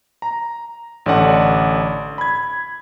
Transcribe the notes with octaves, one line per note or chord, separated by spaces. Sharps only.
A#5
A1 D3 D5 F#5
B5 G#6